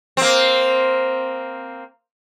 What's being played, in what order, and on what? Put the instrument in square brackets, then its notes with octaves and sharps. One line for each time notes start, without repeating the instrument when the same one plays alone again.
[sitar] A#3 C4